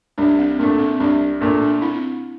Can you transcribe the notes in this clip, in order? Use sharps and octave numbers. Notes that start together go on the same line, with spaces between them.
C2 D4
C4
A#2 A3 D4
C4
C2 D4
A#2 A3 D4
D4
C4 E4